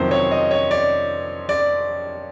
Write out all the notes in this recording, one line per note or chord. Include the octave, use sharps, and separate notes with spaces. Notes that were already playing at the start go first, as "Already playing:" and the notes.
Already playing: F2 C3 D#3 F#3 C5
C#5
D#5
C#5
D5
D5